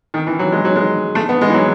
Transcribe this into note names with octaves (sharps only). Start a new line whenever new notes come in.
D#3
E3
F#3
G#3
F#3
G#3
A3
B3
G#3
E3
F#3